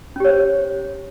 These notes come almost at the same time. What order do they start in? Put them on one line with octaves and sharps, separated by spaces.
C#4 G4 C#5 C5